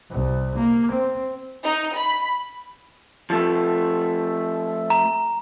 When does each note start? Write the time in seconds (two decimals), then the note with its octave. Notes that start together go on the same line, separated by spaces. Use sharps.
0.10 C2
0.56 A#3
0.92 C4
1.64 D#4
1.96 B5
3.30 F3 A3
4.90 A#5